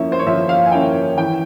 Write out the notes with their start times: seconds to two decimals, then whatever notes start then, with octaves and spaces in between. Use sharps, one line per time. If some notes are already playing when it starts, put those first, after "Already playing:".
Already playing: F3 A#3 C#4 E4
0.12 C5
0.19 C#5
0.27 F3 E5
0.49 F5
0.66 G#5
0.72 A#3 C#4 E4 G5
1.17 E3 G5